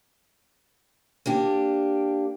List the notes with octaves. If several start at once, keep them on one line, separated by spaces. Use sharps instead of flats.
A#3 D4 G4